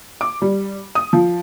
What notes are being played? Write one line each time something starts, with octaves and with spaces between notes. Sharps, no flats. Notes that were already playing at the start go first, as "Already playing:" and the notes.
D6
G3
D#6
F3